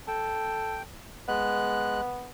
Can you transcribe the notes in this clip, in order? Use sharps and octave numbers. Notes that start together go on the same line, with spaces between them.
A4 G5
G#3 B3 F#6